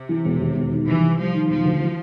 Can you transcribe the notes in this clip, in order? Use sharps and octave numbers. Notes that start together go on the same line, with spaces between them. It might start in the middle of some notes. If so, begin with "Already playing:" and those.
Already playing: C3
E3
E1
D#2
E1
D#3
C2 E3
C3
F3 G3
D#3
E1 F3
D2
E3